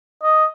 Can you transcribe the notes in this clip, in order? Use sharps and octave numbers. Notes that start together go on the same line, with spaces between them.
D#5